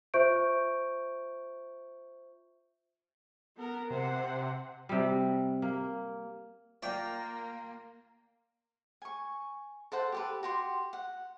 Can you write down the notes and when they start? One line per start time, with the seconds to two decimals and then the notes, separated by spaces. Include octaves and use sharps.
0.14 F4 C5 E5 C#6 G6 D7
3.57 B3 A#4
3.91 C3 C5 F#5
4.89 C3 G3
5.62 A#3
6.83 A#3 F4 A#4 D5 G5
9.02 G#5 C#6
9.92 A4 C5 F#5
10.12 G4 A4 B4
10.43 F#4 G4 C6
10.93 F#5